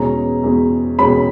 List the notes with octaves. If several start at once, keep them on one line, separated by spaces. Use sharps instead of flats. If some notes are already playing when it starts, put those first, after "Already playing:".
Already playing: E2 B2 G#3 C#4 A#5
E2 B2 G#3 C#4
E2 B2 G#3 C#4 B5